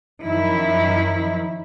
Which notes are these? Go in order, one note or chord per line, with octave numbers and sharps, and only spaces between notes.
F#2 D#3 F3 E4